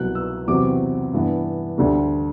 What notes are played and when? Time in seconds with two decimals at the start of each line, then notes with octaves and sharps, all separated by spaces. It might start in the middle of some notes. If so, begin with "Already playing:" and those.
Already playing: C2 B2 F#3 F#6
0.15 E6
0.47 E2 C3 F#3 C4 D6
1.13 G2 E3 B3 D4
1.78 D2 D3 G3 D4